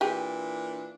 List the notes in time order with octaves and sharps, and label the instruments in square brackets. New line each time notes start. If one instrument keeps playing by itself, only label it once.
[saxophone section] A#2 E3 D4 [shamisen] G4 G#4